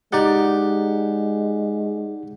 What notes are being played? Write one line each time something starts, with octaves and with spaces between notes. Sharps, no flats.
G#3 D#4 G4 D5 F#5